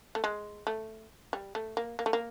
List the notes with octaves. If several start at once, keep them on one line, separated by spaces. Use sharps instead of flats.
A3
G#3
A3
G3
A3
A#3
A#3
A3
A#3